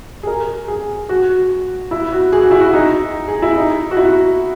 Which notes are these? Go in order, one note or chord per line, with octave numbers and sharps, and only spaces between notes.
G#4
A#4
G#4
F#4
E4
F#4
G#4
F#4
E4
F#4
D#4
G#4
E4
D#4
F#4
E4